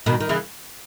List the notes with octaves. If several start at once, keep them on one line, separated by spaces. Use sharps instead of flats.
B2 D#3
D#3
C#3 E3